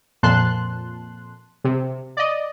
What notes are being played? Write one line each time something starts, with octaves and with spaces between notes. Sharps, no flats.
F2 A#2 A5 C6 F#6
C3
D5 D#5